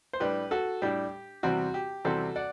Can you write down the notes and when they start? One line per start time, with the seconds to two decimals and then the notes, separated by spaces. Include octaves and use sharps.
0.13 C5
0.20 A2 G3 D4 G4 B4
0.51 F#4 A4
0.82 A2 G3 D4 G4
1.43 E2 C3 G3 C4 F#4
1.74 G4
2.05 E2 C3 G3 C4 F#4 A4
2.36 D5 F#5